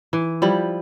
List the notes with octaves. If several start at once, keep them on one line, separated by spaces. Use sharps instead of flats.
E3
F3 G3 E4